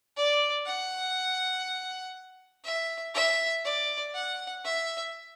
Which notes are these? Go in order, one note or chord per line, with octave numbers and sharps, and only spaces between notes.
D5
F#5
E5
E5
D5
F#5
E5